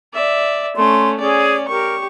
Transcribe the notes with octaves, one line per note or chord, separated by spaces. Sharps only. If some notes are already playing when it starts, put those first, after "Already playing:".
D5 E5
A3 C#4 C6
C#4 G#4 D5
G4 A#4 C#6